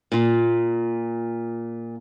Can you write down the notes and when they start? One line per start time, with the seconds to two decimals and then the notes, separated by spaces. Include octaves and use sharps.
0.12 A#2 F4